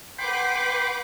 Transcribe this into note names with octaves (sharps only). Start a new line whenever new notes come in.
B4 F#5 G5 B5 C6 D6